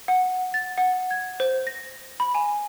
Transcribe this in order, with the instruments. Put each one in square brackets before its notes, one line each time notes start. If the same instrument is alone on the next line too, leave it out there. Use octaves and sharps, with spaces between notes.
[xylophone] F#5
A6
F#5
G#6
C5
A#6
B5
G#5